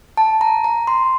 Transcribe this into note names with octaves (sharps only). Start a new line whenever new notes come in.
A5
A#5
A#5
C6